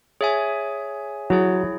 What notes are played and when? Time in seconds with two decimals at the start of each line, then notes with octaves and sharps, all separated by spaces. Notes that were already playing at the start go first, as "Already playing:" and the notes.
0.21 G#4 C#5 E5 G#5
1.30 F#3 E4 G#4 C#5